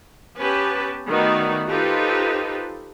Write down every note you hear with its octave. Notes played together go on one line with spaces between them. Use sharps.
B3 C#4 G4 B4 A5
D#3 A3 B3 D#4 F#4 D5
D#4 F4 G4 A4 B4 C5